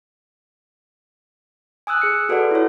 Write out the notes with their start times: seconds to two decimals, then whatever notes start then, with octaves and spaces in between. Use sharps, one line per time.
1.87 G#5 D#6 E6 F#6
2.02 G#4 C#7
2.29 F#4 A4 B4 D5 F#5
2.51 E4 F4 C#5